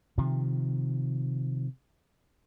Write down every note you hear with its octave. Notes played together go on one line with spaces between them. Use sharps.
C3 D#3 F3